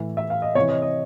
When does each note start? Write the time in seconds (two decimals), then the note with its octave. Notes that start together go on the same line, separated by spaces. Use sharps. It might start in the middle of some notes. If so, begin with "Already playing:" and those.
Already playing: A2 E3
0.17 E5
0.30 F5
0.42 D#5
0.55 C3 C#5
0.60 E3
0.69 D#5
0.82 D#5